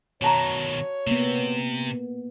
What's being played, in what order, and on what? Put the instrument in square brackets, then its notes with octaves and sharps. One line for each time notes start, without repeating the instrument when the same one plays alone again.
[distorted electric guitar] B2 D#3 [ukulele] F#4 A5 A#5 [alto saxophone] C#5
[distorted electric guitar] C3 [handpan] A#3 B3